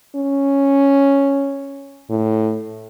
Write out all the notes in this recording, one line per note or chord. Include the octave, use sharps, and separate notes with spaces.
C#4
A2